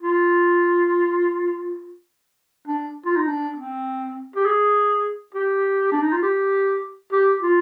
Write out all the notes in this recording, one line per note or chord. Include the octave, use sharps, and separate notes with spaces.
F4
D4
F4
D#4
D4
C4
G4
G#4
G4
D4
D#4
F4
G4
G4
F4